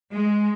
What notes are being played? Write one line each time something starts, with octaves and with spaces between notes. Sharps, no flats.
G#3